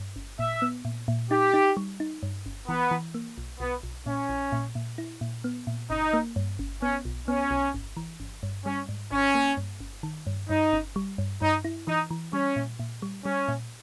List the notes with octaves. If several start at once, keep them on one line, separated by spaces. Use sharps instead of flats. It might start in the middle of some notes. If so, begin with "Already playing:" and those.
Already playing: G2
G1
A#2 E5
B3
A#2
A#2
D#4 G4
D#4
G3
D#4
G2
G1
E3 B3
E3
A#3
B1
B1 B3
B1
A#2 C#4
A#1
A#2
A#2
E4
A#2
B3
A#2
G1 D#4
A#3
G2
G1
B3 C#4
B1
B3 C#4
B1
G1
E3
G1
G2
G3 C#4
G#2
G#1 C#4
A#3
G2
G1
D#3
G2
G2 D#4
G1
G3
G2
G2 D#4
E4
E3 D#4
E3
G3 C#4
A#2
A#2
G3
G3 C#4
A#2